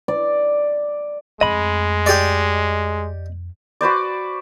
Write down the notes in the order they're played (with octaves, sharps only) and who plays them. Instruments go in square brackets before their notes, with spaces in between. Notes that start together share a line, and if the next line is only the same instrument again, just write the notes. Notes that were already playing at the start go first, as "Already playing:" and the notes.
[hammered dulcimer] D5
[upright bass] F2 A3 [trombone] G#3 [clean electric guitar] D#5 B5
[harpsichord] G4 D5
[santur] F#4 B4 C5 D5